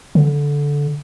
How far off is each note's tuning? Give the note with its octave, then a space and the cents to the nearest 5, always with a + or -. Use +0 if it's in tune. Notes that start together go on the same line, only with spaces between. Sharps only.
D3 -15